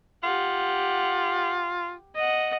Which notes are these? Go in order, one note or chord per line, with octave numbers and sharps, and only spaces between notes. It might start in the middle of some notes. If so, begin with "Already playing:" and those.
F4 G4 F#5
D#5 F#5